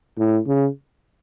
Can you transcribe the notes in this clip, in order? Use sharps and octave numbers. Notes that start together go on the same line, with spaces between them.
A2
C#3